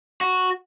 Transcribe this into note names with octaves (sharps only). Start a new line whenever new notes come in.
F#4